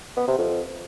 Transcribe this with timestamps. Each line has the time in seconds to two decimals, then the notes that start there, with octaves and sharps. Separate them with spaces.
0.17 B3
0.28 C3
0.38 F2